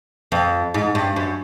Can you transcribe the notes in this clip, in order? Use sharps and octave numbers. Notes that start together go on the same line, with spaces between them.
F2
G#2
G2
F#2